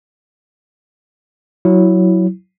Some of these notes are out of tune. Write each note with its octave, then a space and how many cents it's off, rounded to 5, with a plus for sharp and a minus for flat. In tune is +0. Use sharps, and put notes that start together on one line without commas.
F#3 +0 E4 +0